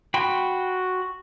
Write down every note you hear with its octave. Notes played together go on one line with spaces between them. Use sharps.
F#4 G5 B5 C6